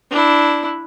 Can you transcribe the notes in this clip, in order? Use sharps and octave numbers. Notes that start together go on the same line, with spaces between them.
D4 E4